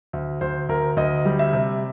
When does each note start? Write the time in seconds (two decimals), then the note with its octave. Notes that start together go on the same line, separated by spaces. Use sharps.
0.13 D2
0.41 D2 C5
0.69 D2 A#4
0.96 D2 D#5
1.25 G3
1.39 E5
1.53 C3